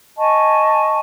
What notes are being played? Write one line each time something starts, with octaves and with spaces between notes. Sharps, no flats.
D#5 G#5 A5 C#6